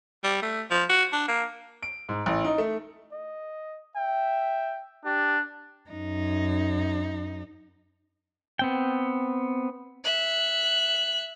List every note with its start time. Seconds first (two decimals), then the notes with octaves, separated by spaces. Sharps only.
0.24 G3
0.42 A3
0.71 F3
0.90 F#4
1.13 D4
1.28 A#3
1.83 D7
2.09 G#2
2.26 A1
2.45 D#4
2.58 A3
3.12 D#5
3.96 E5 G5
5.05 D4 G4
5.91 F#2 D#4
8.59 B3 C4 G5
10.04 E5 F#6